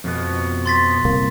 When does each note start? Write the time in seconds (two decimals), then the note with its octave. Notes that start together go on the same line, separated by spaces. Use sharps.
0.04 F2 B2 B3
0.66 C6 A6 B6
1.05 C2 C3 A#3